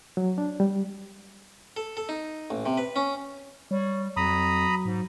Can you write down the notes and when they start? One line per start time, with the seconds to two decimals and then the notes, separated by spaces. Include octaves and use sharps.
0.17 F#3
0.38 D4
0.60 G3
1.77 A4
1.97 A4
2.09 D#4
2.50 A1
2.66 C3
2.77 B4
2.96 C#4
3.71 G3 C#5
4.17 F2 F#3 A#5 B5 D#6
4.85 G#2